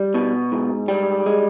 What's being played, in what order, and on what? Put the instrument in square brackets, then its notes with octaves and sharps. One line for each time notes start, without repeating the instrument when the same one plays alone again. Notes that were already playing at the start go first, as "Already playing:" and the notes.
Already playing: [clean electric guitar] G3
B2
G#2
G3
G#3